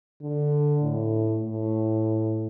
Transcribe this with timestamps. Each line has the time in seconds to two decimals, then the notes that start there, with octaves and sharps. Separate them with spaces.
0.22 D3
0.82 A2
1.43 A2